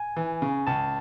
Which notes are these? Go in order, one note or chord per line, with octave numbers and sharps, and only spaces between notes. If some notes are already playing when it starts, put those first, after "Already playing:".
Already playing: G#5
E3
C#3
C#2 A5